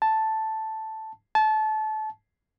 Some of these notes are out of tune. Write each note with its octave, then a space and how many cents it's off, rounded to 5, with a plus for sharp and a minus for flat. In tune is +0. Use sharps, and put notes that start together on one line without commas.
A5 +0
A5 -25